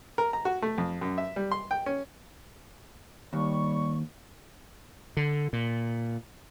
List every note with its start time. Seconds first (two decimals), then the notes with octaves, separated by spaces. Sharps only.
0.18 A#4
0.33 A#5
0.45 F#4
0.62 A3
0.78 F2
1.01 F#2
1.18 E5
1.36 G3
1.52 C6
1.71 G5
1.86 C#4
3.33 D#2 G3 C#6
5.17 D3
5.53 A#2